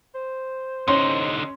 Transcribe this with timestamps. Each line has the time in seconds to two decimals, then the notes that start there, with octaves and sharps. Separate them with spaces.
0.15 C5
0.88 D3 C#4 D#4 C6